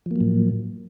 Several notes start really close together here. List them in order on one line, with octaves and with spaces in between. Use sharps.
F3 A#3 F#3 A2